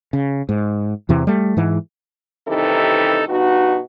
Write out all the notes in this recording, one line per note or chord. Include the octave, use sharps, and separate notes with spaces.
C#3
G#2
E2 C3 E3
G3 A3
G#2 E3
G2 C3 D#3 E3 D#4 A4
G2 B2 D#4 F#4